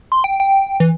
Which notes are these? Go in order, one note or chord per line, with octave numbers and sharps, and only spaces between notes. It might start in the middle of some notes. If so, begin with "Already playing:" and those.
C6
G5
G5
E3